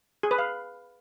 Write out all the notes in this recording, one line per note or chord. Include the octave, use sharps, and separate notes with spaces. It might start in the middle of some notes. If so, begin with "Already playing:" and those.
G#4
B4
F5